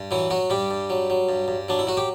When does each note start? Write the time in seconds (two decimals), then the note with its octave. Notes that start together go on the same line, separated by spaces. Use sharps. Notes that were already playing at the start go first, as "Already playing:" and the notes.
Already playing: G2
0.11 E3 F#3 E4
0.30 F#3 F#4
0.50 G2 G3 G4
0.71 G2
0.90 F#3
1.10 F#3
1.29 G2
1.48 G2
1.69 F#3 D4
1.79 E4
1.87 F#3 F#4
1.97 G4